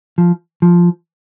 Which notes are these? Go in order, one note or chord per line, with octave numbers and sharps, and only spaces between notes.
F3
F3